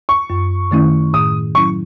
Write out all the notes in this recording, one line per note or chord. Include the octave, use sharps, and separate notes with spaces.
C#6
F#2
D#3 A3 C#4 E4
A2 D#6
F#3 C#4 E4 C#6